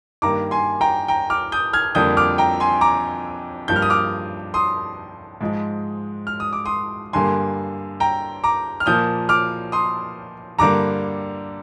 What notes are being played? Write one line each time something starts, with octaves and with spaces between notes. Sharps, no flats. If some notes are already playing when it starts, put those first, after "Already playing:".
G2 D#3 A#3 A#5 D6
G#5 C6
G5 A#5
G5 A#5
D6 F6
D#6 G6
F6 G#6
F2 D3 G3 A#3 D#6 G6
D6 F6
G5 A#5
G#5 C6
A#5 D6
G2 F3 A#3 G6
F6
D#6
D6 F6
C6 D#6
G#2 F3 G#3
F6
D#6
D6
C6 D#6
G2 D3 G3 A#3 G#5 C6
G5 A#5
A#5 D6
F6
A#2 F3 A#3 D#6 G6
D6 F6
C6 D#6
G2 D3 G3 A#3 A#5 D6